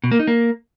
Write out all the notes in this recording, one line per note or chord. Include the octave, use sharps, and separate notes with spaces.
B2
A#3
D#4
A#3